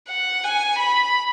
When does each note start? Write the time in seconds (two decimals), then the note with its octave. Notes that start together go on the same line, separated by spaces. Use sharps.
0.08 F#5
0.44 G#5
0.79 B5